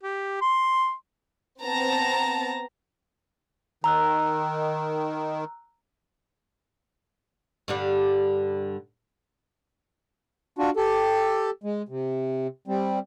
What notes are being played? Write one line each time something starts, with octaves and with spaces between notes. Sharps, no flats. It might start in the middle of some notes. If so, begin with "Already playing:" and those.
G4
C6
B3 C4 A5 A#5
D#3 A#5 E6 F#6
G2 D3 G3
D4 F4 F#4
G4 A4
G#3
C3
G3 C4